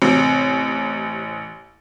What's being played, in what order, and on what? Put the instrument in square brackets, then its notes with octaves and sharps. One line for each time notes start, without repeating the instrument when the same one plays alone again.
[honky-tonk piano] A1 [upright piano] C3